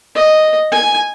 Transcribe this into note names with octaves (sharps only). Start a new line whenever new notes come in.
D#5
G#5